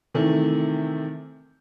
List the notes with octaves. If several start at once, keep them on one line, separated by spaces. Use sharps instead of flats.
C3 D#3 E3 A3